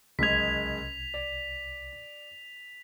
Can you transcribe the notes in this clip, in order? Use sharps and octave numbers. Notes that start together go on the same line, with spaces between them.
F#1 C2 G#3 D#5 G#6 B6 F7
D5